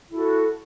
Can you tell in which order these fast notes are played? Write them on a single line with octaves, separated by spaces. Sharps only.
E4 A4 F#4